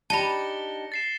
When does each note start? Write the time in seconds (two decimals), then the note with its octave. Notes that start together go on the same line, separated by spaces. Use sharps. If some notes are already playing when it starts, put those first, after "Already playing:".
0.10 D4 D#4 G4 A5 B5 A#6 C#7 G7
0.92 A6 C7 E7